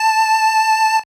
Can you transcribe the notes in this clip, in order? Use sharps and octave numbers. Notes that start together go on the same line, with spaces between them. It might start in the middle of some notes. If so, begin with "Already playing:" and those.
Already playing: A5